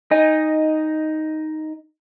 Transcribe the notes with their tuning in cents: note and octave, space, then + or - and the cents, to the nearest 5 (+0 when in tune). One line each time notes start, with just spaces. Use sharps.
D#4 +5 D#5 +0 G#5 -30